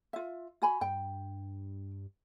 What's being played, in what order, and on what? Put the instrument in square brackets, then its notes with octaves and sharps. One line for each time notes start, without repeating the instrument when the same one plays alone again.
[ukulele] F4 E5
F#4 G#5 B5
[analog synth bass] G2 [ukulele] G5